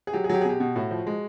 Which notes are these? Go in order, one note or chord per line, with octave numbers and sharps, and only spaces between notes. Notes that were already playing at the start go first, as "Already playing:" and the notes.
G#4
F#3 G4
G#4
F#3 G4
G#4
B2 G4
B2
A2 F#4
F3
G#3